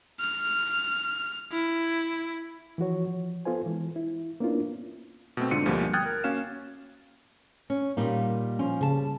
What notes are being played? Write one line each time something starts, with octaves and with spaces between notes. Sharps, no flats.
F6
E4
E3 F3 F#4 C#5
F3
B3 F4 A4 C5 G#5
E3 G#3
E4
A#3 B3 C#4 D4 E4 F4
B2 A3 C4
G#2 D3 F4 C#7 D#7
D2 B2 F3 G3 A#3
G5 D#6 F6 F#6 G#6 A6
A#4
A#3 C#4 F#4 F5 E7
C#4
A#2 G3 A#3 D#4
F3 C#4
C#3 G3 A5